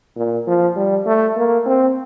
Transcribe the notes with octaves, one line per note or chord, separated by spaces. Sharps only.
A#2
F3
G3
A3
A#3
C4